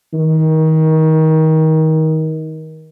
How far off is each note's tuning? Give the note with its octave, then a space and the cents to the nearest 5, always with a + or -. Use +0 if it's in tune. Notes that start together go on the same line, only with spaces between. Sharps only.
D#3 +25